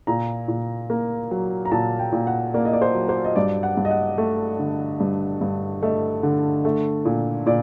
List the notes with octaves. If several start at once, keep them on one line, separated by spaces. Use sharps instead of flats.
A#2 A#5
A#2
A#3
F#3
A#5
A#2 A5
G5
A#2
F#5
A#3 D5
D#5
D5
C5
F#3
C5
D#5
G2 D5
F#5
G2
D#5
F#5
A3
D3
G2
G2
A3 D#5
D3
A3
A#2
A#2 D5